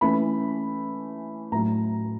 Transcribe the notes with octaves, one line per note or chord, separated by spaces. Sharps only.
E3 A3 C#4 B5
A2 F#3 A3 A#5